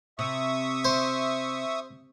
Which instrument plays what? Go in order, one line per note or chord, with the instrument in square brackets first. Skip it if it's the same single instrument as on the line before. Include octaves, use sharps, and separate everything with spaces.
[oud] C3 [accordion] E5 C#6 D#6
[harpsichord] C5